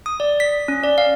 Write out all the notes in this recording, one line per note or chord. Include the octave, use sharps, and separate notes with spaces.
D#6
D5
B6
C#4
D5
F5